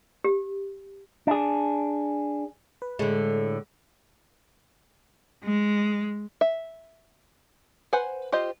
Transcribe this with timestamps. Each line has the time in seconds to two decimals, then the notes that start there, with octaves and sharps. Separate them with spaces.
0.24 G4
1.27 D4 G#4
2.82 B4
2.99 A2 D3 G#3
5.44 G#3
6.41 E5
7.93 B4 C5 F#5 G#5
8.32 F4 G4 C5 D#5